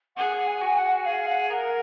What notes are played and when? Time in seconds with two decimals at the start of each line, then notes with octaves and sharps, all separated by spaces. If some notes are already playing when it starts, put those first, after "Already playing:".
0.16 G#4 F#5
0.47 G#5
0.62 F#4
0.70 G#5
0.76 F#5
1.05 G#4 F5
1.28 F#5
1.50 A#4 F#5